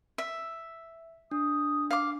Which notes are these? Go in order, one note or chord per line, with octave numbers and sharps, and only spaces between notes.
E5
D4 D#6
F5 D6